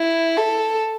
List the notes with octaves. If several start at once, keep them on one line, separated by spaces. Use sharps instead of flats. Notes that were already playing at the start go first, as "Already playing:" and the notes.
Already playing: E4
A4